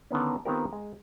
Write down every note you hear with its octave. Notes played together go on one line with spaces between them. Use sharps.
D3 D#3 B3 C#4
D#3 B3 C4 F4 G4 A#4
G#3 A#5